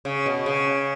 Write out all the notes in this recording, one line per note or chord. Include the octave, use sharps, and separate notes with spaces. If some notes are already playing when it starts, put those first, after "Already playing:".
C#3
B2
C#3